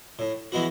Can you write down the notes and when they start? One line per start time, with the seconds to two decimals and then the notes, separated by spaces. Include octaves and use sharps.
0.19 A2
0.52 E3 G#3 B3 F#4